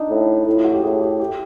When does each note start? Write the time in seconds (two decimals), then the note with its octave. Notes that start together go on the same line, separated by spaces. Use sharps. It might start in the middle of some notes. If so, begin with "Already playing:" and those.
Already playing: D4 D#4
0.10 A2
0.46 A2 E4
0.56 F4
0.64 F#4
0.74 G4
0.83 A2 G#4
1.01 G4
1.20 G4